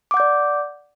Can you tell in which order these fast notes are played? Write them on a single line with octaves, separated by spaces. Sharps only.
D6 F#5 G6 D5